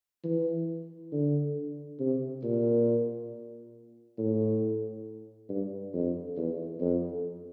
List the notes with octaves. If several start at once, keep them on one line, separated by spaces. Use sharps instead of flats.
E3
D3
C3
A#2
A2
G2
F2
E2
F2